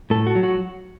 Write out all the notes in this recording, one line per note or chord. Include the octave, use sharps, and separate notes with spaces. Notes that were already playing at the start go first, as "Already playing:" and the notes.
A2 A4
F#4
F#3
F#4